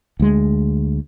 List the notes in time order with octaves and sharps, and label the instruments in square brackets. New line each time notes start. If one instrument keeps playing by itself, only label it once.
[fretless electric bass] D2 G#3